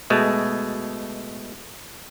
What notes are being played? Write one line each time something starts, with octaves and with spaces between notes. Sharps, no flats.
B2 G#3 A3